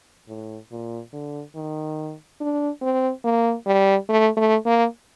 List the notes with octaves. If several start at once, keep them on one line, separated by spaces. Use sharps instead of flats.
A2
A#2
D3
D#3
D4
C4
A#3
G3
A3
A3
A#3